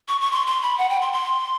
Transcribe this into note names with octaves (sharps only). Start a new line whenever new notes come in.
C#6
C#6
C6
C6
B5
F#5
G5
C6
C6